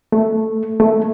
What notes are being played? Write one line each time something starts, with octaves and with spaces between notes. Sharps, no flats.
A3
A3